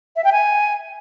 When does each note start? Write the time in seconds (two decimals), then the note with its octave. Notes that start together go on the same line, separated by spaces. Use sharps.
0.16 E5
0.24 G5
0.32 G#5